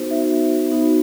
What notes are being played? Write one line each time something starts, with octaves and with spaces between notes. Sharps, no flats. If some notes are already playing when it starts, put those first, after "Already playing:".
Already playing: B3 D#4 F#4 C5
B3 D#4 F#4 E5
B3 D#4 F#4